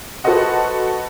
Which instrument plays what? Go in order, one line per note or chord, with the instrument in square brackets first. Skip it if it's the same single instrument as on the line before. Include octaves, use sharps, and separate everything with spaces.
[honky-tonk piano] F#4 A4 B4 C5 D#5 F#5